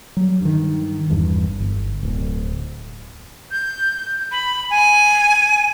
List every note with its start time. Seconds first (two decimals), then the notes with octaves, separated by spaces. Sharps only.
0.17 F#3 G3
0.41 G2 D#3
1.10 G#1 E2 G2
1.60 G1
2.03 D1
3.52 G6
4.32 B5
4.70 G#5